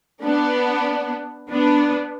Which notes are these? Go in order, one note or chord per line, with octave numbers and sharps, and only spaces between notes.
B3 D4
B3 D4